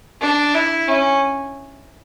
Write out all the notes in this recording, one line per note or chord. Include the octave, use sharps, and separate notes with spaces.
D4
E4
C#4